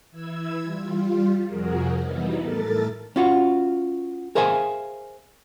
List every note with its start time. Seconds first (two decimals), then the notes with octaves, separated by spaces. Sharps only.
0.11 E3 E4 E6 G#6
0.63 G3 F4
1.46 F2 C3 F3 F#4 G#4 A#4
1.99 E3 F#3 G3 B3 D#4 E4
2.39 A2 A3 A4 A#4 A6
3.16 C#4 F4 F#4
4.35 G#4 A#4 C5 E5 F5 G#5